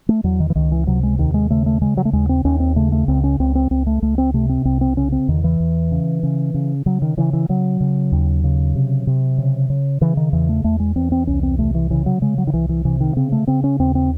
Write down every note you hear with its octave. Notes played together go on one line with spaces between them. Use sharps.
A3
E2 F#3
D#3
E3
C#2 D#3
E3
C3 F#3
G#3
D#2 D#3
G#3
C#3 A3
A3
C#3 G#3
F#3
A3
D#2 G#3
C4
D#2 C#4
C4
C#3 A3
A3
C#2 C4
C#4
C#2 C4
C4
C#2 C4
A3
C#2 A3
C4
C3 A3
C4
C2 C4
C4
C#3 C#4
C4
E2 D#3
E3
E2
C#3
C#3
C#3
C#3 F#3
D#3
C#3 E3
E3
C#3 F#3
C#3
D#2
C#3
C3
C3
C#3
C#3
C#3 E3
D#3
E2 E3
A3
E2 A3
G#3
E2 C4
C4
C2 C#4
C4
C3 A3
E3
C#3 E3
F#3
C#3 G#3
F#3
D#3
C2 E3
E3
C3 E3
D#3
C#3 C4
A3
C#3 C4
C#4
D#2 C4
C4